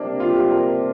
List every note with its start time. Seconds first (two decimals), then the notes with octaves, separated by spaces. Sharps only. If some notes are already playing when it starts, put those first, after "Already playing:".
Already playing: C3 A#3 D4
0.20 F4
0.30 G4
0.40 F4
0.51 A#4